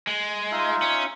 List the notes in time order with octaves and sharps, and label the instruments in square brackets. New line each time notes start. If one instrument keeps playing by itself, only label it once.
[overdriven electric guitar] G#3
[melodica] D#4 F4 E5
[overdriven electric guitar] C#4